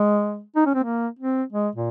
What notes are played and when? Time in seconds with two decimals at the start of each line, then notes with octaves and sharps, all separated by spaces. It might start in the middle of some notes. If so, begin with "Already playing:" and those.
Already playing: G#3
0.56 D#4
0.66 C#4
0.75 C4
0.84 A#3
1.19 C4
1.52 G#3
1.75 A#2